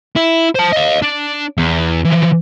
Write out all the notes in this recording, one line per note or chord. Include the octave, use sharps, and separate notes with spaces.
E4
C5 A5
D#5 F5
D4
E2
E3 F3